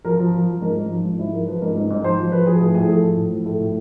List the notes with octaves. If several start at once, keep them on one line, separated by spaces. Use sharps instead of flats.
F3 A#4
F3
F3
F3
G#2 A#4
G#2
F3
G#2
G#2 E4
F3 A#4
F3 B4
G#2 A#4
G#2
G#2
F3 C5
F3
F3 B4
F3 G#4
A2 G#4
A2 G#4
F3 A4
A2
A2
F3
A2 A4
A2